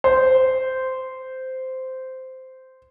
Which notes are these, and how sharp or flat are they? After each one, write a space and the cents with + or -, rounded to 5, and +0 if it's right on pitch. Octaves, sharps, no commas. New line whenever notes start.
C5 -10